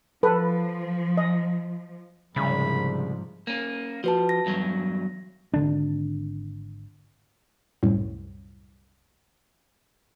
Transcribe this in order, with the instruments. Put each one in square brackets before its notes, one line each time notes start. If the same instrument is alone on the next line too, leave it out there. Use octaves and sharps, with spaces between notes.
[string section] F3 [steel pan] A4 B4
[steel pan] D#5
[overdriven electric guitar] C2 [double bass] G#2 F3 [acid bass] C#3 [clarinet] B5
[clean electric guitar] A#3 C#4
[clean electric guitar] F3 [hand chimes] F#4 B4 A5
[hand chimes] A#6
[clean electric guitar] E2 G2 F#3
[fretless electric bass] G#1 D3 D4
[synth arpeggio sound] C2 F#2 A2